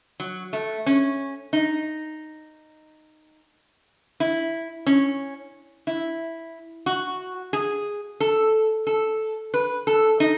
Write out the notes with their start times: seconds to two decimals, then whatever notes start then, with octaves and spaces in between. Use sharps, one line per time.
0.20 F#3
0.53 A3
0.86 C#4
1.53 D#4
4.20 E4
4.86 C#4
5.87 E4
6.86 F#4
7.53 G#4
8.20 A4
8.87 A4
9.54 B4
9.87 A4
10.20 D#4